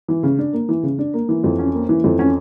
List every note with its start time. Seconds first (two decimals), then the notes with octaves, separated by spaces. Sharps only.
0.08 E3
0.23 C#3
0.39 D4
0.53 A#3
0.69 E3
0.83 C#3
0.98 D4
1.14 A#3
1.29 E3
1.44 F2
1.58 C#4
1.74 A#3
1.89 E3
2.04 F2
2.19 C#4